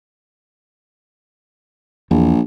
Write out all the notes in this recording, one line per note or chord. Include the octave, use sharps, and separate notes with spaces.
A#1 E2